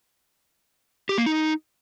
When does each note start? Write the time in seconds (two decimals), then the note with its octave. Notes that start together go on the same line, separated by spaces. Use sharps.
1.09 G4
1.18 A#3
1.26 D#4